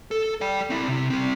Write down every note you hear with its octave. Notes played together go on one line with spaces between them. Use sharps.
A4
D5 G5
C4 E4
C3
G3 C4